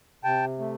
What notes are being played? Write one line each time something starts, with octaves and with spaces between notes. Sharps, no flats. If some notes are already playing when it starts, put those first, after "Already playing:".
C3 G5 A5
A3